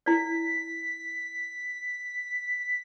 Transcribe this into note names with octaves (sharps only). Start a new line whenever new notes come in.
E4 D5 B6